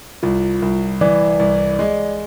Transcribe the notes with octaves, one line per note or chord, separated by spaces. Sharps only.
C2 F4
C2
E3 D5
C2
G#3